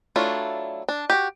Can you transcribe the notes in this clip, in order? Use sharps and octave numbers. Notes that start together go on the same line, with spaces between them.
F#3 A3 D4 E4 F4
D4
F#4 G4